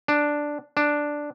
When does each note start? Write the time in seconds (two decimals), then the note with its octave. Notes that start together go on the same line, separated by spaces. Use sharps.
0.08 D4
0.77 D4